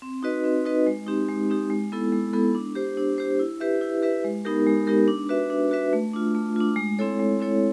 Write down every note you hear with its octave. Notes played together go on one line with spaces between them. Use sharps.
C4
D#4 F#4 B4 D#5
C4
D#4 F#4 B4 D#5
G#3
C4 D#4 G4
G#3
C4 D#4 G4
G#3
B3 E4 A4
G#3
B3 E4 A4
D4
G4 C5
D4
G4 C5
E4
G4 B4 E5
E4
G4 B4 E5
G#3
B3 D#4 G4 A#4
G#3
B3 D#4 G4 A#4
D4
F#4 B4 E5
D4
F#4 B4 E5
A3
D4 F4
A3
D4 F4
G#3
C4 E4 A4 C#5
G#3
C4 E4 A4 C#5